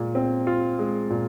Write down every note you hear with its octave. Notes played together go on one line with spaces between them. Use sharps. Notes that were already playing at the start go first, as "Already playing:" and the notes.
Already playing: A#2 G#3
C4
F4
G#3
A#2